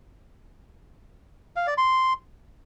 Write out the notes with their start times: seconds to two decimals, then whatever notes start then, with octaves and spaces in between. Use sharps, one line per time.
1.56 F5
1.67 D5
1.78 C6